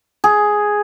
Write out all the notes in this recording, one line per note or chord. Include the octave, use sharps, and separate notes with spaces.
G#4